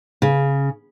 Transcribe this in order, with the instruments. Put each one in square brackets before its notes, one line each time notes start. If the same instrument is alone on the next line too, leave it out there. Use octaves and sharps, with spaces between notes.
[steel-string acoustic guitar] C#3